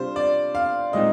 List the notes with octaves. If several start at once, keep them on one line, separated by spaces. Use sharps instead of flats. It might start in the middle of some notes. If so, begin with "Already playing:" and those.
Already playing: C3 G3 D4 F4 C5
D5
F5
A#2 G#3 C4 D#4 D#5